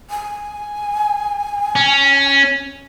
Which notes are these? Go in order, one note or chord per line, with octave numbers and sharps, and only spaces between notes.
G#5
C#4